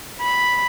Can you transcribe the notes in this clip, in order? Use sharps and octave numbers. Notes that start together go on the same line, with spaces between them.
B5